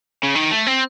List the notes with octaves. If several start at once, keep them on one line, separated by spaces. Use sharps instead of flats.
C#3
D#3
A3
C4